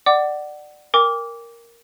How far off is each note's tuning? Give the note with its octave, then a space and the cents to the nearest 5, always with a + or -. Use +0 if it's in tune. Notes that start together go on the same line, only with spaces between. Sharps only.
D5 +20 F#5 +20 D6 +0
A#4 +0 G5 +40 D6 -20